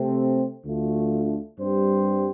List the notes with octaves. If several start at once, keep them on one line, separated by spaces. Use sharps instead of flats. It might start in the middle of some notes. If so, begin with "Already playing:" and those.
Already playing: C3 A3 C4
D2 D3 A3 F4
G2 G3 C4 G4 C5